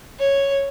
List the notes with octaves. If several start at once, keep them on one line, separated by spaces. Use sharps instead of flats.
C#5